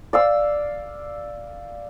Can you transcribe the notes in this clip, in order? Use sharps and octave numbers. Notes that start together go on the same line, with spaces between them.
D5 F5 E6